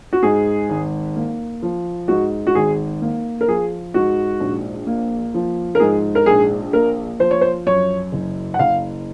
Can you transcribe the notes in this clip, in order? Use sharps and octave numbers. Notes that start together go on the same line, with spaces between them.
F#4
G#2 G#4
G#1
A#3
F3
G#2 F#4
F#4
G#1 G#4
A#3
A#4
F3 G#4
G#2 F#4
A#1
A#3
F3
A#4
G#2 G#4
A#4
A#1 G#4
A#3 A#4
F3 C5
C#5
C5
F#2 C#5
F#1
F#5
F#1 F5